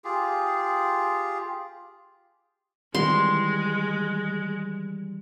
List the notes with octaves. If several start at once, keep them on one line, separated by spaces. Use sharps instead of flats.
F4 G4 G#4
D#3 E3 G3 G#3 C6